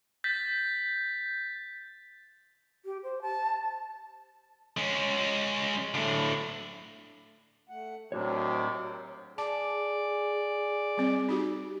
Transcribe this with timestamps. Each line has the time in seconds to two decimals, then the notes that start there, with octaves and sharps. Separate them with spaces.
0.24 G6 A6 B6
2.85 G4
3.03 C5
3.22 A5
4.77 G#3 C#4
5.94 A2 D3
7.69 A3 F#5
8.12 D#2 A2 C3 F#3 C4 D4 F#4 C#5
9.38 G#4 D5 A5
10.97 G3 C4
11.29 D#4 F#4 G4